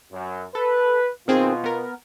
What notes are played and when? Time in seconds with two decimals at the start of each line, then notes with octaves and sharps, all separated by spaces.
0.12 F#2
0.55 A4 B4
1.28 B2 D#3 C4 F4 G#4
1.64 B3 A#4